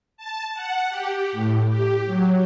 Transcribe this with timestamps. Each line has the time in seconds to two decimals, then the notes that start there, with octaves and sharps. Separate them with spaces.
0.17 A5
0.54 F#5
0.89 G4
1.32 A2
1.70 G4
2.06 F#3